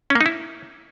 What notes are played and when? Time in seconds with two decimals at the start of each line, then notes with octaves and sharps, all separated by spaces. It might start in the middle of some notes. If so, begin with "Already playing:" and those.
0.10 C#4
0.15 A#3
0.21 D#4
0.26 E4